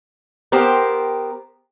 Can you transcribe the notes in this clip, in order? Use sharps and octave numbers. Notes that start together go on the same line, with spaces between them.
B3 G4 A#4 C5